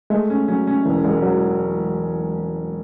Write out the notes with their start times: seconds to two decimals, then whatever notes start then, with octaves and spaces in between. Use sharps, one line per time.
0.10 G#3 A3
0.30 C#4
0.48 F#3 C#4
0.67 C#4
0.85 E1 E3
1.04 E1 G#3
1.23 F#3